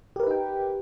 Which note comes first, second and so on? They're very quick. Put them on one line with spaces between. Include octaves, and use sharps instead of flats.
G4 A#4 B4 D#4 G5